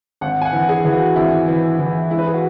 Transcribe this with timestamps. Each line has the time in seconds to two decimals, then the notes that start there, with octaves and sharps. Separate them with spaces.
0.21 G#1 F#5
0.41 G#5
0.45 F#5
0.53 E3
0.69 G#4
0.84 E3 G#4
0.92 F#4
1.16 G#1 E4
1.48 E3
1.79 E3
2.10 G#3 E4
2.19 B4
2.26 G#4
2.34 F#4